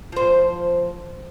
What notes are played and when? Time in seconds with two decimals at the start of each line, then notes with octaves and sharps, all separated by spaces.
0.12 F3 C5